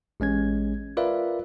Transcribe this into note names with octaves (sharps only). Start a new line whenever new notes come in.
A1 G#3 C#4 G#6
F4 A#4 B4 D5 E5 F5